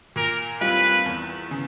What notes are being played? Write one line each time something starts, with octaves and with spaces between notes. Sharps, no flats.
A#2 A#4
G3 C4 F4 B4
E2
C#3